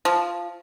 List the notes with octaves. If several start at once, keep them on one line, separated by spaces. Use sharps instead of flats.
F3